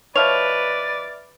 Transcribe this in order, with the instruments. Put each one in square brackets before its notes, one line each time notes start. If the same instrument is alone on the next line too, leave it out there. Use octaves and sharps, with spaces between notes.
[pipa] B2 F3 C#5 [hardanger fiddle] B4 [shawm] D5 [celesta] E5 F6 F7